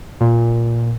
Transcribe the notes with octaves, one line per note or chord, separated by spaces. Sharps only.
A#2